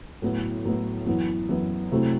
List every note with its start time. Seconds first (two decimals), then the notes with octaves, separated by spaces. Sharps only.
0.22 A2 F#3 B3 E4
0.65 A2 F#3 B3 E4
1.06 F#2 E3 B3 E4
1.49 F#2 E3 B3 E4
1.92 C3 F#3 A3 C4 E4